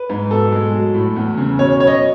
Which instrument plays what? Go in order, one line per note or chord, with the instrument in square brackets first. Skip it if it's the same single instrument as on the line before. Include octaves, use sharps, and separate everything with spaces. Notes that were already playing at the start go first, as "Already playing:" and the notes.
Already playing: [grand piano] B4
G#2
B2 A4
G#3
F#3
A2
E2
C#3
B2 C#5
F#3 C#5
D#5